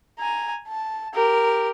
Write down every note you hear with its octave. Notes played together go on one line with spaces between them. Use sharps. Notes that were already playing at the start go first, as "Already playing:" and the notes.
G#5 A#5
A5
G4 A#4